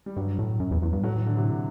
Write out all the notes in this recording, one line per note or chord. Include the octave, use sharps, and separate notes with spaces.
G3
G2 F#3
A2
F#2
E2
E2
G2
A2 F#3
E3
D3
C3